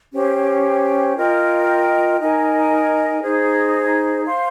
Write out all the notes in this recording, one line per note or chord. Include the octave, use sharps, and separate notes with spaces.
C#4 G4 C5 G5
F4 A#4 D#5 G5
D#4 A#4 D#5 G#5
D#4 G#4 C5
C5 F5 C6